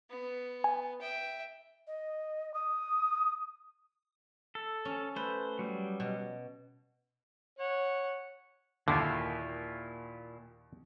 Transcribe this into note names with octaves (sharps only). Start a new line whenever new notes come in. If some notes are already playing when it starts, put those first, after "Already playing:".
B3
G#5
E5 G5
D#5
D#6
A4
C#4
A3 B4 C5
F#3 G3
B2
C#5 F#5
D#2 A#2 D3 E4 F4